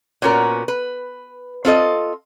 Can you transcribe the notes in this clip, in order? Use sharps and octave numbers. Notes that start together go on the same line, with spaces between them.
A#2 B3 C#4 F#4 A#4
B4
C4 F4 A4 D#5